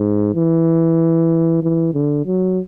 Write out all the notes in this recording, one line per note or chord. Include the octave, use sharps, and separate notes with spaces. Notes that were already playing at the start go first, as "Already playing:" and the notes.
Already playing: G#2
E3
E3
D3
F#3